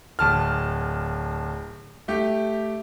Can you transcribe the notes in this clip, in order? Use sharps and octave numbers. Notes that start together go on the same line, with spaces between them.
D1 A5 F6
A3 G4